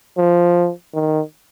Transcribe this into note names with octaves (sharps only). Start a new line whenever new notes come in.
F3
D#3